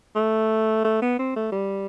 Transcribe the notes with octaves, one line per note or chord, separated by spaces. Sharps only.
A3
A3
B3
C4
A3
G3